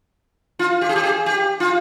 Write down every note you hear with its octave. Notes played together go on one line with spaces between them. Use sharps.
F4
G4
G#4
G4
G#4
G4
F4